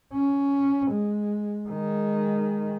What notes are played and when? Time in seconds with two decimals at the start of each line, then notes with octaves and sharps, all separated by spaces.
0.13 C#4
0.91 G#3
1.69 D#3 G#3